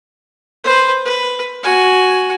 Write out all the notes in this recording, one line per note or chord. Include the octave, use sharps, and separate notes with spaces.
B4 C5
B4
F#4 G#5